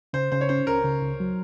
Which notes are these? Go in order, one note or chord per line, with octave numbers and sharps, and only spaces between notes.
C#3 C5
C#3 C5
C#5
C#4 C5
C#2 A#4
C#3
C#2
F#3